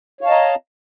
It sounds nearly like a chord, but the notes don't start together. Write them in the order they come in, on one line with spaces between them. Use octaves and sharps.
C#5 F5 A5 D#5 A#5